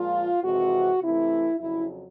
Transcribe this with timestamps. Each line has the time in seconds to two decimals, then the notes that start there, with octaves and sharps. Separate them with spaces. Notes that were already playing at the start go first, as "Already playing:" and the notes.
Already playing: A#2 F3 G#3 F4
0.43 F2 C3 E3 G#3 F#4
1.02 C3 E3 A3 E4
1.60 F2 C#3 F#3 E4